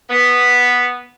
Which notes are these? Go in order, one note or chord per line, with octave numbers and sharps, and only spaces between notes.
B3